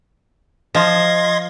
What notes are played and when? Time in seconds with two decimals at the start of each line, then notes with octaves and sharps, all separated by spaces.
0.75 F3 D#5 C6 G#6 A#6